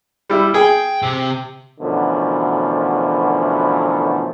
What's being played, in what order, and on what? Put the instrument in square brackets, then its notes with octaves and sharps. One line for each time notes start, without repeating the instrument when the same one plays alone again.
[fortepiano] G3 E4
[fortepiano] G#4 [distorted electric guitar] G5
[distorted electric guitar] C3 C4
[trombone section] F#2 B2 D3 E3 F3 A3